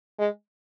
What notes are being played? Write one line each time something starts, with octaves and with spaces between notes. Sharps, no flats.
G#3